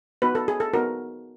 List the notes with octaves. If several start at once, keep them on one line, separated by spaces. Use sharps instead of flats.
B3 D#4 F#4 B4
A4
G#4
A4
B3 D#4 F#4 A#4